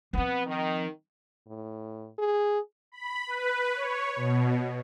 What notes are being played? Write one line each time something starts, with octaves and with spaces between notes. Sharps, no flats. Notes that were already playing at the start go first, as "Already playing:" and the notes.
F3 B3 C4
D#3
A2
G#4
B5
B4
C#5
B2